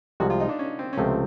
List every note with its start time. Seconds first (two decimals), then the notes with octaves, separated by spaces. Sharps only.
0.20 C2 C3 F3 G#3 F#4
0.30 F4
0.40 D#4
0.49 D4
0.59 C#4
0.79 C4
0.93 C#4
0.98 C#2 C3 F3 A3 C4